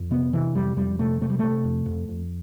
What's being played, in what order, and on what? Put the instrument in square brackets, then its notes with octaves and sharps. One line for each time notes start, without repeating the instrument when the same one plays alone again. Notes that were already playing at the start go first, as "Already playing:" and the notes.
Already playing: [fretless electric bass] F2
C3 B3
C3 E3
F2 G3
F2 G3
C3 A3
C3 A3
G3
C3 A3
F2
F2
F2